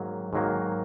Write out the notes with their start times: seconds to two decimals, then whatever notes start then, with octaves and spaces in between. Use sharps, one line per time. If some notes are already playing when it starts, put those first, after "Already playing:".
Already playing: G#2 D#3 F#3 A#3
0.33 G#2 D#3 F#3 A#3